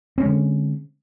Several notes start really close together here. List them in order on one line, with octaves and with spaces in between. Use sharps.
C4 C#4 G#3 D3